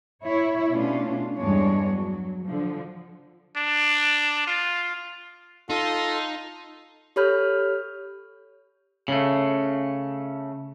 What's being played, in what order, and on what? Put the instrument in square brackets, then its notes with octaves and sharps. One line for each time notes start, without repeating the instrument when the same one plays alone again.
[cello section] E4 C#5
B2 A3 C#4 D4 F4
E2 G2 G#3 D4 C#5
F#3
D3 F3
[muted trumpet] D4
F4
[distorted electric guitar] D#4 [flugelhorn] F4 [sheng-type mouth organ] A4 C6
[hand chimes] G4 A4 C#5 B5 F6 G6
[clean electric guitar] C#3 A3